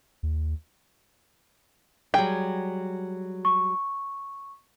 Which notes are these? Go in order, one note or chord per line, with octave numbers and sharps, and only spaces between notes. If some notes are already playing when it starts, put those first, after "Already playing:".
D#2
F#3 G3 G#4 G5
C#6